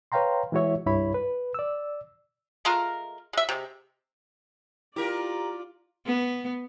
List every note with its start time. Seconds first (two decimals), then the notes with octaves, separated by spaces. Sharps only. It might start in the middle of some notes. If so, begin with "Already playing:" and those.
0.12 B4 C#5 F5 G5 A#5 C6
0.52 E3 G#3 E4 F#4 C#5 E5
0.86 C2 G2 E4 C#5 B5
1.14 B4
1.54 D5 E6
2.65 G#3 A3 F4 A#4
3.33 G#3 E5
3.49 C3 G#3
4.96 E4 F4 G4 A#4 D5
6.06 B3